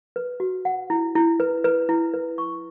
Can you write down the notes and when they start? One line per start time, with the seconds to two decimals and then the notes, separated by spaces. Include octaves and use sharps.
0.16 B4
0.40 F#4
0.65 F#5
0.90 E4
1.15 E4
1.40 B4
1.64 B4
1.89 E4
2.14 B4
2.38 C#6